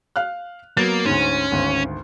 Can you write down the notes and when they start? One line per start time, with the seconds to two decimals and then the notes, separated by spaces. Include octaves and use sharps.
0.16 F5 F6 F#6
0.77 F#3 A#3 B3 A6
1.05 D2 G#2 C#4
1.52 G#1 D2